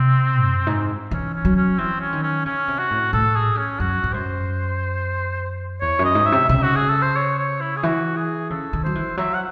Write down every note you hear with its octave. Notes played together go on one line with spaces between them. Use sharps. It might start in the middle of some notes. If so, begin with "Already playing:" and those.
Already playing: C3 C4
F#2
G#2
E3 C#4
C#4
F#3
C#4
E3 C4
C#4
D#3
C#4
C#3 C#4
C3
F#4
A2
A2 A4
G#4
C#4
F#2 F#4
G#2
F#2 C5
E2 C#5
F#2
D#5
G#2
E5
C3
C#3 E5
F#4
G#4
A4
C5
C#5
C#5
E4
G#4
E3 F#4
G#4
C#3 A4
D#3
F#3 C5
E3
F#3 E5
F#5